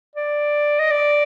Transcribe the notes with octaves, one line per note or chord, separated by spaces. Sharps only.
D5
D#5
D5